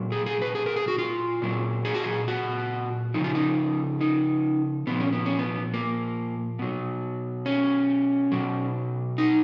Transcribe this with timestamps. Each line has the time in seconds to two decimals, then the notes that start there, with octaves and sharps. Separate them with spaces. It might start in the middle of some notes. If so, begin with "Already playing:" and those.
Already playing: A#2 F#3
0.12 G#4
0.26 G#4
0.42 B4
0.55 G#4
0.66 A#4
0.76 G#4
0.88 F#4
0.98 F4
1.42 A#2 F#3
1.85 G#4
1.94 F#4
2.04 G#4
2.28 F#4
3.14 C#3 F3 D#4
3.24 F4
3.35 D#4
4.01 D#4
4.87 A#2 F3 B3
5.00 C#4
5.12 B3
5.26 C#4
5.39 B3
5.74 A#3
6.59 B2 F#3
7.46 C#4
8.32 B2 F#3
9.18 D#4